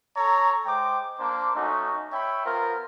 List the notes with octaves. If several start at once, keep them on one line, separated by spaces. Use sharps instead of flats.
A4 C#5 A#5
G#3 C5 G5 D6
A#3 D4 C5 D6
A3 C#4 D#4 F#4
C#5 E5 G5 B5
B3 F4 A#4 C5